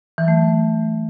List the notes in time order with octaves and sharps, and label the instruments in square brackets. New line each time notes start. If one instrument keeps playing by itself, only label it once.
[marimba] E3
F#3
A3